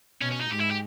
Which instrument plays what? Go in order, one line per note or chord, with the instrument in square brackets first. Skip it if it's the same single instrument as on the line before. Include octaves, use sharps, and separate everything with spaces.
[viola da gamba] B2 [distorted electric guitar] C#4
[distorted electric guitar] C#4
D#4
[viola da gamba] G#2 [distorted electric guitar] G4
[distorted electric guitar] E4
G4